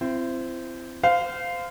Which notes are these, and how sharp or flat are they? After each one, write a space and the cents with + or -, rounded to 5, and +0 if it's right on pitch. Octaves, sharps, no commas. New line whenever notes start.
C4 -10 E4 +35
C5 -30 F5 +0